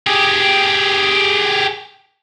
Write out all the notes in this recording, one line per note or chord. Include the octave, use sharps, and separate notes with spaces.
G4 G#4